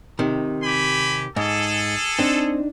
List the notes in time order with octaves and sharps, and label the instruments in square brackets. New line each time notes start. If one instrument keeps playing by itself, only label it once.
[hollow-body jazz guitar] C3 D#3
[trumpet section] G4 G#5 B5
[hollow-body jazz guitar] G#2 [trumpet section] G#4 A4
[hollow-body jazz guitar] C4 [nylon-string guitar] D4 D#4